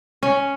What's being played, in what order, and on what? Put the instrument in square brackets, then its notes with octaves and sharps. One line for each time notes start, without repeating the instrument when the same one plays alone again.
[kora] C#4